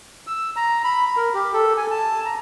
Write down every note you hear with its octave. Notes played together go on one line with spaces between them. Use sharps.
E6
A#5
B5
A#4
G4
A4
G#5
A5
A#5